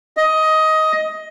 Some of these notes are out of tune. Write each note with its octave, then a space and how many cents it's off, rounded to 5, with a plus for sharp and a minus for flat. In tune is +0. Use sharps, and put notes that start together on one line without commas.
D#5 +15